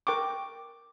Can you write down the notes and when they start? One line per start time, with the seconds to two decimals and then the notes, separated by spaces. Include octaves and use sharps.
0.07 A#4 G5 C#6 D6